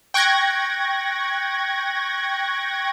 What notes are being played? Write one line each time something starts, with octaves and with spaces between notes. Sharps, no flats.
G5 C#6 F#6 G#6 A#6